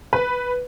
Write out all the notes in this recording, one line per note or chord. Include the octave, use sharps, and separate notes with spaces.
B4